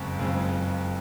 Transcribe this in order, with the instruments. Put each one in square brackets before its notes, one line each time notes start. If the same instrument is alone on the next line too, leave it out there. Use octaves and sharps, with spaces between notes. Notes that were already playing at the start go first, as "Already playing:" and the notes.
Already playing: [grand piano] F#1 F2 C#3 G#3 C4 C#6
F#1 F2 C#3 G#3 C4